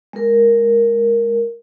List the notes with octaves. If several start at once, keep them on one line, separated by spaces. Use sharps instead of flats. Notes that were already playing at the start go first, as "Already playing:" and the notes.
G#3 A#4